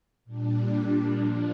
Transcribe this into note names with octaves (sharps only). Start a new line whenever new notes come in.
A#2 G3 D4
F3 A#3 D4 F4